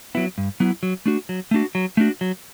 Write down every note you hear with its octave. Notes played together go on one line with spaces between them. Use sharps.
F#3 B3 E4
G2
F#3 B3 E4
F#3
A3 D4 F#4
F#3
A3 D4 F#4
F#3
A3 D4 F#4
F#3